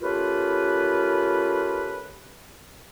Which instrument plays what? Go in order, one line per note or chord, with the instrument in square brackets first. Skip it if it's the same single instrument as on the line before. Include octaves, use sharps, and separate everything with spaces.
[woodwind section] A3 C#4 F4 G4 A#4 B4